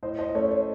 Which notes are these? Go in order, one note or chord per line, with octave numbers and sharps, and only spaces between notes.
A2 C5 D#5
C5 D#5
D#5
A3 C#4 C#5
C#5